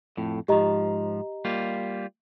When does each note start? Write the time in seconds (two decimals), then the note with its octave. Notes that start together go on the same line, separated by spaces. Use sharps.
0.17 F2 A2
0.48 G#2 F3 G4 D#5 A#5
1.45 G3 A#3 F4